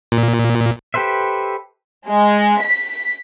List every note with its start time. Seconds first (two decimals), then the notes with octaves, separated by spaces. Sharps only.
0.12 A#2
0.94 G4 A4 B4 C5 E5
2.09 G#3
2.62 B6